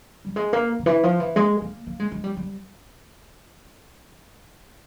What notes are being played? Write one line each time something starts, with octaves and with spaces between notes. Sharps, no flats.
G3
G#3
A#3
C#3
E3
F3
E3
G#3
A#3
A#3
G#3
G#3
G3
G3